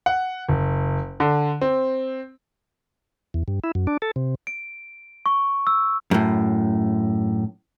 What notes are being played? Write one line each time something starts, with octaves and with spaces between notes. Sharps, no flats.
F#5
F#1
D3
C4
E2
G2
E4
F#2
D4
A4
C3
D7
C#6
E6
F#2 A2